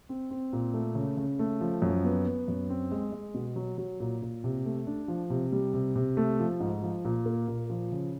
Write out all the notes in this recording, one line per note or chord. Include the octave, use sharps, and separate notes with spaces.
C4
C4
A#2
A3
C#3
C#3
A3
F3
F#2
B3
B3
F#2
C4
G#3
G#3
B2
F#3
F#3
A#2
A#2
C3
A3
D4
F3
C3
G3
C3
C3
A3
F3
G#2
F3
A#2
A#3
A#2
F3
C#3